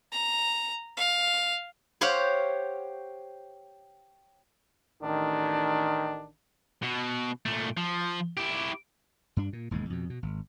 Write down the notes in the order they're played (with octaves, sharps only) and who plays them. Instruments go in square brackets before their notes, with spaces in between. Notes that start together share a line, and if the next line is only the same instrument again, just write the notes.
[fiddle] A#5
F5
[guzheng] G4 C5 C#5 F5 F#5
[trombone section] A1 D#3 [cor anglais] D4
[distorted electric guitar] B2
A#2 A3
F3
E4 G4
[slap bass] G2 D4
A#2
E1 D#2 G#2 G#3
F2 B2
B2
G#1